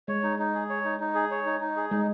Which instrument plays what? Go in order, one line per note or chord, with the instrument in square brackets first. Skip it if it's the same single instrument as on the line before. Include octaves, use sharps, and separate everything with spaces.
[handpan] G#3 [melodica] C#5
[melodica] D#4
D#4
G#4
C#5
D#4
D#4
G#4
C#5
D#4
D#4
G#4
[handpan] G#3 [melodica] D#4